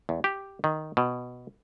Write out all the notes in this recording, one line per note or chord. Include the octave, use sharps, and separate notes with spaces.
E2
G4
D#3
B2